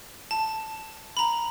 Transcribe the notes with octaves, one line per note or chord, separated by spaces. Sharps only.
A5
A#5 B5